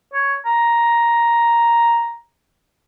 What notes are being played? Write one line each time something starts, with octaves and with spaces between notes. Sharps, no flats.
C#5
A#5